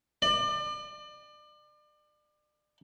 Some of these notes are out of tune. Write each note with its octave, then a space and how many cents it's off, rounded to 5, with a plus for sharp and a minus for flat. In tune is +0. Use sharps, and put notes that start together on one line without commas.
D5 +35